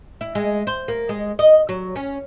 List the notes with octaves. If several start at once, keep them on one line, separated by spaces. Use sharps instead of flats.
E4
G#3
C5
A#3
G#3
D#5
F#3
C#4